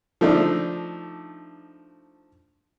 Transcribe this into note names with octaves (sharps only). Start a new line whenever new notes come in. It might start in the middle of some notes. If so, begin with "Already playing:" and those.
F3 A3 D4 D#4